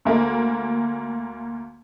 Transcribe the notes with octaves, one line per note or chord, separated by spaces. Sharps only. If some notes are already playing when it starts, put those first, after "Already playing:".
D2 A#3